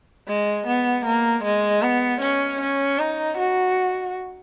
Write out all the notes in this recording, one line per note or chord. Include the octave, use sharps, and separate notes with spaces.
G#3
B3
A#3
G#3
B3
C#4
C#4
D#4
F#4